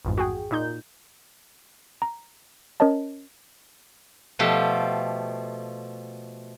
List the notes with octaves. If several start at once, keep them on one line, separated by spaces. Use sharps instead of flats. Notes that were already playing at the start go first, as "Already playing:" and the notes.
A1 F2 G#2
F#4 G#4 G5
A#2 D#4 G6
A#5
C#4 A#4 C#5 D#5 A5
B2 F3 A3 G4